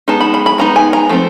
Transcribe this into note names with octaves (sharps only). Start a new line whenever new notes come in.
G#3 B3 D#4 A5
B5
B5
B5
G#3 B3 D#4 A#5
G#5
A#5
F3 A3 C4